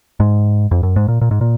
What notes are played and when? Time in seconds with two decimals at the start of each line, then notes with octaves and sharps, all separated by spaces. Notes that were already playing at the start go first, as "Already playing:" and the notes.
0.20 G#2
0.71 F2
0.83 F#2
0.96 G#2
1.08 A#2
1.21 A#2
1.31 G#2
1.41 A#2